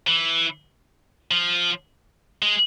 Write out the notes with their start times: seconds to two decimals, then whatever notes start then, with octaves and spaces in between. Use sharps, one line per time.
0.07 E3
1.31 F3
2.42 G#3